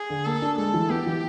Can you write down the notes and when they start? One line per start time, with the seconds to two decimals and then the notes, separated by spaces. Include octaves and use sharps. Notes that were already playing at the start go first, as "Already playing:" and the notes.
Already playing: G#4
0.10 D3
0.25 A#3 A4
0.42 D4
0.58 G#3 A4
0.74 E3
0.90 B3 G4
1.06 E3